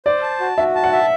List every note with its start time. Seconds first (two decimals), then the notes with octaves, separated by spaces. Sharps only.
0.06 C5 D5
0.22 A5
0.40 F#4
0.58 F#4 E5
0.75 A5
0.84 F#5
0.92 E5